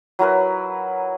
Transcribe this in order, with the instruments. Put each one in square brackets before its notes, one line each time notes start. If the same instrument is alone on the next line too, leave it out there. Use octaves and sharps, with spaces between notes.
[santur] F#3 E4 A#4 B4